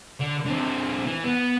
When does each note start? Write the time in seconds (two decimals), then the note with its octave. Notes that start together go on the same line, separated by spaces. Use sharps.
0.20 D3
0.46 D3 C4
1.06 E3
1.24 B3